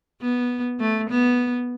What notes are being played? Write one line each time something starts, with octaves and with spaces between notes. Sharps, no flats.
B3
A3
B3